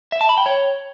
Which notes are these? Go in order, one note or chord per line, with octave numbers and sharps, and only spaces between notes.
E5
A5
B5
G5
C#5